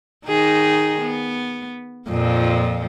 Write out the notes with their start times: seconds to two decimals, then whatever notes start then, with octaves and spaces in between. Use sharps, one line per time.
0.26 D#3 D#4 G#4
1.01 B3
2.08 F2 A#2 F3